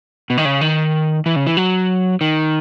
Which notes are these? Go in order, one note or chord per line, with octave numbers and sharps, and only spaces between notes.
B2
D#3
C#3
D#3
E3
C#3
E3
F#3
D#3